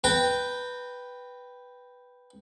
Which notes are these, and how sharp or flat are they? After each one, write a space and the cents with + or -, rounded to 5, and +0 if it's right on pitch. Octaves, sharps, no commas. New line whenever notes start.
B4 +0 G5 +0 A#5 -30